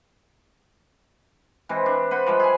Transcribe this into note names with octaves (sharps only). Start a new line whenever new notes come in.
E3 G#3 C4
D4
B4 C5 F#5 B5
F3 G3 G#3
G#4 G#5